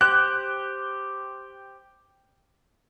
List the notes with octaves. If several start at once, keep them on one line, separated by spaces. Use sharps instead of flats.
G4 C5 F#6